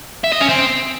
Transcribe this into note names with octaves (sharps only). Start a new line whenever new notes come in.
E5
D#5
C#4
C4